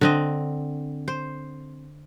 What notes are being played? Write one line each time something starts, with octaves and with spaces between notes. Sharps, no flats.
D3 C4 D#5
C5